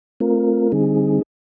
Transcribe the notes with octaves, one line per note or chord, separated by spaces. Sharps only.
A3 C4 F4 A#4
D3 G3 C4 D#4 G#4